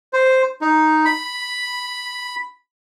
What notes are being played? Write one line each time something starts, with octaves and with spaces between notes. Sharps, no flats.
C5
D#4
B5